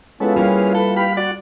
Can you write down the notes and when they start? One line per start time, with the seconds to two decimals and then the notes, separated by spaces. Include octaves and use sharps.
0.20 G#3 B3 C#4 E4 F4 A4 B4
0.36 G3 A#3 C#4 G#4 F5
0.75 A4
0.96 G4 F5 B5
1.17 F#4 D5